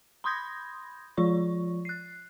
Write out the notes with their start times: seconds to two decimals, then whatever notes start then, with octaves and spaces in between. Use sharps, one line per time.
0.24 B5 C6 D#6 G6 G#6 A#6
1.17 F3 F4 D5 C#6
1.85 F#6 C7